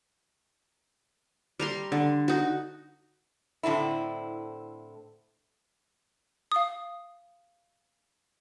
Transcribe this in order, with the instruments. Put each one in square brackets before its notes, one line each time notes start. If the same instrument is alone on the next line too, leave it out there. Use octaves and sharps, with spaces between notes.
[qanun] G3 A#5 C6
D3
D#4 F#4
[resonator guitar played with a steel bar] A2 D3 C4 E4
[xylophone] F5 D#6